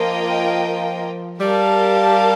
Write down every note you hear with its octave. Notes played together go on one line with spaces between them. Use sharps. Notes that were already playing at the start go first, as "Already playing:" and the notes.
Already playing: F3 A#3 F4 A#4 D#5 G5
G3 G4 A#4 F5 A5